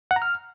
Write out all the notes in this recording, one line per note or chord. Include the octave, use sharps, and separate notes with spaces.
F#5
A#5
F6